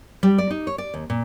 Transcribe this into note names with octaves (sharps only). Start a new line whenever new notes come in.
G3
D5
D#4
C#5
D5
D#2
A#2